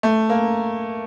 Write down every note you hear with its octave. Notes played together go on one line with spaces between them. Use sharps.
A3
A#3